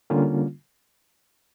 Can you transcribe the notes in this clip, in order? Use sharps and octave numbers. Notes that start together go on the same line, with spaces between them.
D3 G3 A#3 C#4 F4